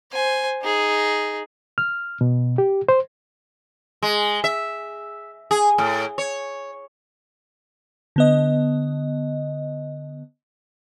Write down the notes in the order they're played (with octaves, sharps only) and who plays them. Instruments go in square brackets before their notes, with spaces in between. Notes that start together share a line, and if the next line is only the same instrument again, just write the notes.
[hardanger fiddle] C5 G#5
D#4 G#4
[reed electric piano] F6
B2
G4
C5
[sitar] G#3
E5
G#4
A2
C#5
[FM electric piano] D3 B3 D#5